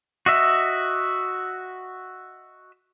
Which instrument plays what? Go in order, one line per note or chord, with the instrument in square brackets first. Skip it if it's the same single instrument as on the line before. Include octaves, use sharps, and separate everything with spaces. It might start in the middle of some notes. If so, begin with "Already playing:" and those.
[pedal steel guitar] F#4 D#5 E5